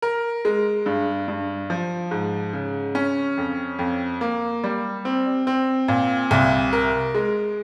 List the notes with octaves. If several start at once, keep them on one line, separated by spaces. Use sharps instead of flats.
A#4
G#3
G2
G2
F3
G#2
C#3
C#4
F2
F2
A#3
G3
C4
C4
A#2
C2
A#4
G#3